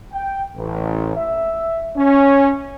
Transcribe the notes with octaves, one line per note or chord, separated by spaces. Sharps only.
G5
A1
E5
C#4